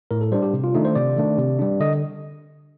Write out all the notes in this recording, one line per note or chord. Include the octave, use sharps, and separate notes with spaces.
A2 A#4
A4
G3 D4 C5
G4
C3
F4
D#3 A3 D4 D#4
C5
C3 D5
D#3 A3 D4
C3
G3 D4
D3 D#5